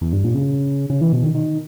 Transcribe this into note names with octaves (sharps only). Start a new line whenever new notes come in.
E2
G2
A#2
C#3
C#3
E3
B2
D#3
D#3